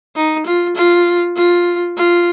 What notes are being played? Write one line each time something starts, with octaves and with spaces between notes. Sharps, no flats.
D#4
F4
F4
F4
F4